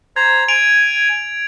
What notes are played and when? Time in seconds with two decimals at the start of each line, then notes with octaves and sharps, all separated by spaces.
0.16 C5 A#5 G#6
0.48 G#5 D7 F7